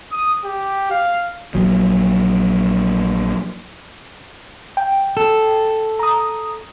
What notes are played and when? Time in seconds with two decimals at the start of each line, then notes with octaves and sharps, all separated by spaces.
0.12 D#6
0.45 G4
0.91 F5
1.55 A#1 F#3
4.77 G5
5.17 A4
5.99 A#5 D#6